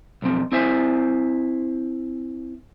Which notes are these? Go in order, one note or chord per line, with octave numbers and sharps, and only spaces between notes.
B1 F2 C4
C4 E4 C5 E5 G#5